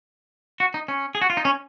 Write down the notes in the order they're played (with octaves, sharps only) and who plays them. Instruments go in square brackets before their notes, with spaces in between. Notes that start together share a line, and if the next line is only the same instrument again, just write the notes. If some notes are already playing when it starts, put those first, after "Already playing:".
[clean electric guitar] F#4
D#4
C#4
G#4
F#4
F4
D#4
C#4